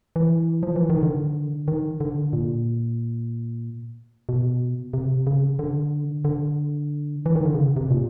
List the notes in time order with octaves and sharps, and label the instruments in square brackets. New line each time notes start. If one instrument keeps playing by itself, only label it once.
[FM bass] E3
F3
E3
D#3
D3
D#3
D3
A#2
B2
C3
C#3
D3
D3
E3
D#3
D3
C#3
C3
A#2